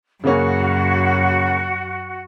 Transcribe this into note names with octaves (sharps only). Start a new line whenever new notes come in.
F#2 C#3 A#3 C#4 F#4